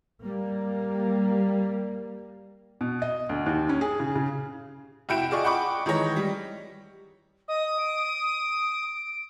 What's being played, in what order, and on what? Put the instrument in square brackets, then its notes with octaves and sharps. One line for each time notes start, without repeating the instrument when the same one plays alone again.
[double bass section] G3 A#3
[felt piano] B2
D#5
D2
D#2
C#4
G#4
C#3
C#3
[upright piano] F1 E4 F#4 G5 D7 E7
F4 G#4 D5 D#5 C#6
D#5 F#5 G5 B5 C#6 D6
D#3 E3 G#3 C#5 A#6
G3
[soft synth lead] D#5 [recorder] D#6
[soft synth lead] D7